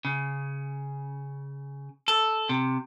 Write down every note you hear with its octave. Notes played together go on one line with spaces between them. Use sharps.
C#3
A4
C3